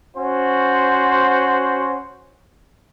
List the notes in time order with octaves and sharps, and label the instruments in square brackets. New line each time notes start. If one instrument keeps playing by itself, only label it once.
[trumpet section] C#4 F#4 C5